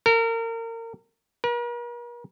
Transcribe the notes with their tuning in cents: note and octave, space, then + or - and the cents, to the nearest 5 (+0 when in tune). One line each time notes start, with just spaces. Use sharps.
A#4 -30
A#4 +45